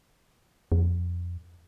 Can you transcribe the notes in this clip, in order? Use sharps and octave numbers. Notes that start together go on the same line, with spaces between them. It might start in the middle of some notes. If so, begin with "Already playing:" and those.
F2